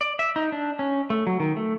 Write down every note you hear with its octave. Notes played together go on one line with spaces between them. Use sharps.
D5
E5
D#4
D4
C#4
A3
F#3
D#3
A3